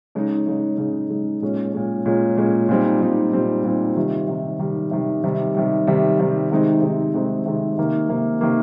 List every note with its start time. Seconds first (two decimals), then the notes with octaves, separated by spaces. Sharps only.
0.15 C#3 G#3 D#4
0.46 C#3 G#3 D#4
0.78 C#3 G#3 D#4
1.10 C#3 G#3 D#4
1.42 A#2 G#3 C#4
1.73 A#2 G#3 C#4
2.06 A#2 G#3 C#4
2.37 A#2 G#3 C#4
2.69 A#2 G3 C4 D#4
3.01 A#2 G3 C4 D#4
3.32 A#2 G3 C4 D#4
3.64 A#2 G3 C4 D#4
3.96 C3 D#3 G3
4.28 C3 D#3 G3
4.59 C3 D#3 G3
4.91 C3 D#3 G3
5.24 C3 D#3 G3
5.55 C3 D#3 G3
5.87 C3 D#3 G3
6.19 C3 D#3 G3
6.51 C3 D#3 G#3 C4 D#4
6.82 C3 D#3 G#3 C4 D#4
7.14 C3 D#3 G#3 C4 D#4
7.46 C3 D#3 G#3 C4 D#4
7.77 C3 D#3 A#3
8.09 C3 D#3 A#3
8.41 C3 D#3 A#3